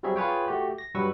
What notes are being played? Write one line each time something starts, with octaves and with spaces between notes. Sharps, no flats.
F#3 G3 C4 G#4 C#5 E5
F4 G#4 B4 C#5 G5
A3 F#4 G4
A#6
G2 F#3 G3 B4 C#6 E6